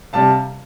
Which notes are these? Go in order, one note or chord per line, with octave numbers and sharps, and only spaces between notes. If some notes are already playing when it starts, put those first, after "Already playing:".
C3 G3 F5 A5